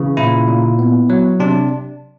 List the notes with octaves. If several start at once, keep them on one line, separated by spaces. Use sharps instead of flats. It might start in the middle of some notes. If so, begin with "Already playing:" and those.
Already playing: C#3 E3
A#2 E4
A#2
B3
F#3
C3 D4